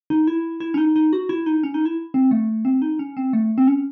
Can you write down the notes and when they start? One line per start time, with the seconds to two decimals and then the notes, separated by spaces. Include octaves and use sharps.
0.10 D#4
0.27 E4
0.60 E4
0.74 C#4
0.78 D#4
0.96 D#4
1.13 F#4
1.29 E4
1.46 D#4
1.63 C#4
1.74 D#4
1.85 E4
2.14 C4
2.31 A3
2.65 C4
2.82 D#4
2.99 C#4
3.17 C4
3.33 A3
3.58 C4
3.68 C#4